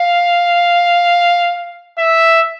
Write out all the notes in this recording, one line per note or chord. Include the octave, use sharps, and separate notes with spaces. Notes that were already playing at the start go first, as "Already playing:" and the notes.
Already playing: F5
E5